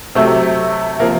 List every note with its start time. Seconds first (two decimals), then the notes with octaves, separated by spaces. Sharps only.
0.15 C3 F#3 A3
1.00 C3 F3 A#3